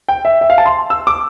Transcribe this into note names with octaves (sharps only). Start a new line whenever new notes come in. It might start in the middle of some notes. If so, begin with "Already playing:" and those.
G5
E5
E5
F5
A5
C6
E6
D6